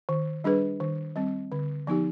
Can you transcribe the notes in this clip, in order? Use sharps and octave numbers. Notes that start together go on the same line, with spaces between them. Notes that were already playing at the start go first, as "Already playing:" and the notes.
D#3
G3 D4 G#4 B4
D#3
G3 C4
D3
F3 B3 D#4 G4